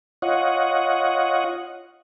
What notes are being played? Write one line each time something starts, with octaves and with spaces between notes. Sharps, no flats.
F4 C#5 D#5 F#5